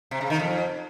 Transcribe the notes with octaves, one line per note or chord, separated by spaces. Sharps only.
C3
C#3
D#3
F2